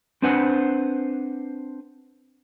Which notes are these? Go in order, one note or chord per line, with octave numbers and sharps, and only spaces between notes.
C4 D4 B4 C5 F#5 G#5